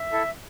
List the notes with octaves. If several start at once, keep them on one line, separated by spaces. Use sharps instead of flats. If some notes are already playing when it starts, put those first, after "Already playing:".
Already playing: E5
E4 A4